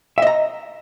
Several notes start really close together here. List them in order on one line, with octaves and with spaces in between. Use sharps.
E5 D#5 A#5